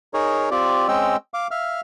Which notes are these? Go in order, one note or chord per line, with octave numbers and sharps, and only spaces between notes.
D#4 G#4 A#4 C#5
C4 F4 G4 D5
G#3 C4 C#4 D#5 G5 E6
F5 D6
E5 F5 F6